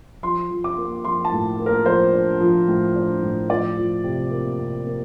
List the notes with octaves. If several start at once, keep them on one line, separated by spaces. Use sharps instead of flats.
F3 C6
F3
D6
A#3
F3 C6
A5
A2
A#3
A#4
F3 C5
D4
F3
A2
D4
A2
F3 D5
F3
C3
A#3
C3
A#3